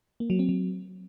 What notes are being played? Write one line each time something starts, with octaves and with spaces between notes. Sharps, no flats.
A#3
F#3
C4
F#3